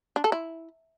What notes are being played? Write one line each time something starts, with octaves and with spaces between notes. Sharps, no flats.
D4
A4
E4